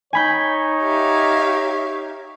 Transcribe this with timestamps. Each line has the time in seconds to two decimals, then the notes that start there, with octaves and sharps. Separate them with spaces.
0.13 D#4 C#5 G#5 B5 G6
0.81 G4 E5 F5